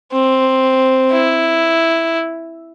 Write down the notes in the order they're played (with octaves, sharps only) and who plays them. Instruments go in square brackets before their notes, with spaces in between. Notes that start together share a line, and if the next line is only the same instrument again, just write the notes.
[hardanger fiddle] C4
E4